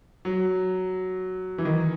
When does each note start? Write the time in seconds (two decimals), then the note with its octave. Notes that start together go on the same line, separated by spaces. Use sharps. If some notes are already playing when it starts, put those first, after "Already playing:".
0.25 F#3
1.58 E3
1.65 D#3